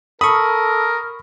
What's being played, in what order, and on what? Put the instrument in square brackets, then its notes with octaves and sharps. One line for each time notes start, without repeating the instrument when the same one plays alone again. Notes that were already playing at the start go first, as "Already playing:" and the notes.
[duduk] A4 [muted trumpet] A#4 [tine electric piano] B5 C#6 [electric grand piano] D#6